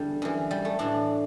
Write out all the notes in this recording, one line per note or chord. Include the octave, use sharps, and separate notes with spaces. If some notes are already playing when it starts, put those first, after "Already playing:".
Already playing: E2 D3 G3
F#2 E3
G3
A3
A2 E3 D4